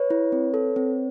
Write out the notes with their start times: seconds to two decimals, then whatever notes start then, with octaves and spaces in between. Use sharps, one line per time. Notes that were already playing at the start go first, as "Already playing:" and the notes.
Already playing: B4 C#5
0.10 E4
0.32 C4
0.54 A4
0.76 C4